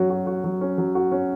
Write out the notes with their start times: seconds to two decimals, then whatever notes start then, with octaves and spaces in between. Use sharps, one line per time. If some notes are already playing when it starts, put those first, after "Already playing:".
Already playing: F#3 C#4 F#4
0.10 F#4
0.27 F#4
0.44 F#3
0.61 C#4
0.78 F#3
0.95 F#4
1.12 C#4